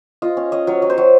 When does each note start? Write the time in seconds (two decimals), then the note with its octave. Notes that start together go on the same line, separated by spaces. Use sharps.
0.22 F4 D#5
0.37 C#4
0.52 C#4 D#5
0.67 F#3 C#5
0.82 F#3
0.90 C5
0.98 F#3